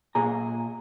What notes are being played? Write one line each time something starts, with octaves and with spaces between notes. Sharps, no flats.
A#2 G#4 A#5